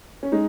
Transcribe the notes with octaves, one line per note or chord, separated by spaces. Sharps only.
C#4
G#3 D#4